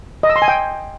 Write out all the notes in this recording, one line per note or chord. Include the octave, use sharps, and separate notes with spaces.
D#5
E6
C6
G#5
G5